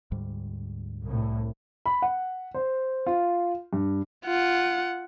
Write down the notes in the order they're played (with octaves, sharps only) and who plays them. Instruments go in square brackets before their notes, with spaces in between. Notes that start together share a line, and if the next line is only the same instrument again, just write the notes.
[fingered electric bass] D2 G#2 G3
[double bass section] C2 A2
[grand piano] B5
F#5
C5
F4
G2
[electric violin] F4 F#5